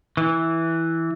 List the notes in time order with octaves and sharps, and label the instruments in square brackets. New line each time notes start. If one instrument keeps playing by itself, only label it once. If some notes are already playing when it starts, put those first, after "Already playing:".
[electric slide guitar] E3